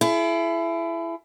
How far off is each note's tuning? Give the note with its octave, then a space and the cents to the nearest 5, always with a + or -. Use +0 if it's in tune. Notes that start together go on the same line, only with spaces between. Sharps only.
E4 +25 G#4 +45